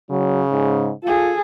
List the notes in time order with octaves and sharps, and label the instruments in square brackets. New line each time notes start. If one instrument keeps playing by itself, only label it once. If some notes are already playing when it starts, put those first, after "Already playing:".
[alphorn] C#3 [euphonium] F#3
[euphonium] G#2
[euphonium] F4 [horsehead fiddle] G#4 A4